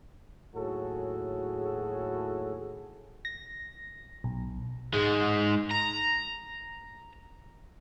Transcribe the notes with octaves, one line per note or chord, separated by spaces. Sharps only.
D#2 A2 F#3 F#4 G#4 A4
A#6
B1
G#2 G#3
A#5